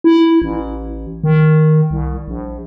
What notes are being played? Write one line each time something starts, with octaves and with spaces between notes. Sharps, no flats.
E4
A1
D#3
C2
A#1